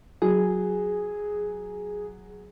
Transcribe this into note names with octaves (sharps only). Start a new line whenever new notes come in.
F#3 G#4